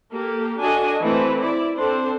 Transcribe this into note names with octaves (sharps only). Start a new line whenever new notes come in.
A#3 G4 A4
D4 F#4 A4 D#5 G#5
E3 A3 C4 E4 B4
E4 D5
C4 D4 A4 C5